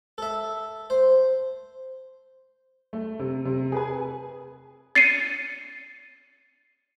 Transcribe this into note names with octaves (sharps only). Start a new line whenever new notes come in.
A4 E5
C5
A3
C3
C3
G#4 B4 G#5
A6 C7 C#7 D#7